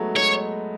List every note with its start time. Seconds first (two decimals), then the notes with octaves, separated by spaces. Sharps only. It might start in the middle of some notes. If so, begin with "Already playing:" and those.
Already playing: F#3 G#3 A3 B3 D#4
0.16 G#3 C#5